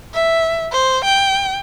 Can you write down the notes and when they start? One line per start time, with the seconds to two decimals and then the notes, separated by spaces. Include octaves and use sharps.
0.14 E5
0.72 C5
1.05 G5